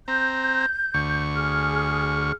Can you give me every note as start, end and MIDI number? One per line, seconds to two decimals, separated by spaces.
0.08 0.66 60
0.08 0.66 82
0.08 1.22 91
0.94 2.32 38
0.94 2.32 85
1.35 2.33 68
1.35 2.33 89